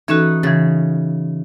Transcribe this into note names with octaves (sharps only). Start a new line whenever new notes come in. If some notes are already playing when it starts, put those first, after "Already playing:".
E3 C#4 D#4 F#4 A4 B4
C#3 E3 A6